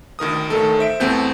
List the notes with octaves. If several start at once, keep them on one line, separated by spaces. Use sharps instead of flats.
D2 D#3 A#4 D#6
A1 D#3 A3 A4
C5 E5 D7
E2 A3 B3 C4 A4 G6